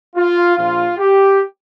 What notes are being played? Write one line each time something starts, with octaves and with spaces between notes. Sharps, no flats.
F4
A#1 A#2 F3 F4
G4